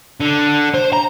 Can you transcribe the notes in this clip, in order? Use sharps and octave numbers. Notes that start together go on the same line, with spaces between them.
D3
C5
A#5